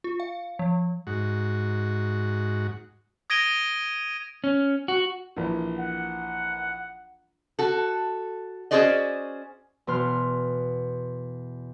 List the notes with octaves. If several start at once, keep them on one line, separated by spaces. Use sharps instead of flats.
F4
F5
F3
G#2 F#4
D#6 G#6 A#6 D7 D#7 G7
C#4
F#4
A#1 E3
F#5
F#4 A4
C#4 F#4 G#4 C5 D5 D#5
E2 B2 C6 F6